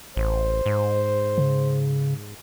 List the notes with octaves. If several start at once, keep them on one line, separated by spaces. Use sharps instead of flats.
A1 C5
G#2
C#3